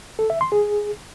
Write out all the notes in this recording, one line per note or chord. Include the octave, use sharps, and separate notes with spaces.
A4
E5
C6
G#4